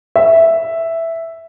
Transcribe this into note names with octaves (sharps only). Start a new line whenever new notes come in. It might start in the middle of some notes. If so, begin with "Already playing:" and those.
E5